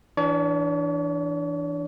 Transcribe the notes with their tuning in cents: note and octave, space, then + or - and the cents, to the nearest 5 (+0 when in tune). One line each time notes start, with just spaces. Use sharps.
E3 +0 D4 +0 C#5 +45